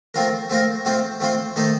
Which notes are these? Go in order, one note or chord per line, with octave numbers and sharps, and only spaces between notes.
A3 C4 F4 A#4
A3 C4 F4 A#4
A3 C4 F4 C5
A3 C4 F4 C5
D#3 A3 D#4 A4 C5